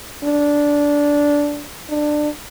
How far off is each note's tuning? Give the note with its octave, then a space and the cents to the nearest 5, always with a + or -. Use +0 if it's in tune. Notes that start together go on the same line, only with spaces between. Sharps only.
D4 -10
D4 +20